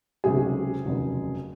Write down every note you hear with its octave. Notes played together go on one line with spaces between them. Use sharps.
C#2 C3 D#3 F#3 A3 G#4
F1 D#2 C#3 F#3